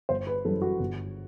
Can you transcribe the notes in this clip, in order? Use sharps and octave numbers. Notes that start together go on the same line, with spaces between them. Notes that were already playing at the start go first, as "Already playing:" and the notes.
G1 C5
B4
F#2 E3 G3 A4
F#4
G1